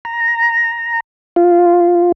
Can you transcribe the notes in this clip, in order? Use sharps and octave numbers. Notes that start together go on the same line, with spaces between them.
A#5
F4